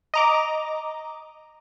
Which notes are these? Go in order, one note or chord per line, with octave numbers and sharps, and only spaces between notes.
D#5 A#5 D6